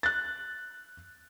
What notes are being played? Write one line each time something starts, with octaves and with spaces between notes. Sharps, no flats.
F#6 A6